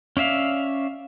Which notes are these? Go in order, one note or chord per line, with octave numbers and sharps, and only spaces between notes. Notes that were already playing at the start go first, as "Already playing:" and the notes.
C#4 D5 E5 F5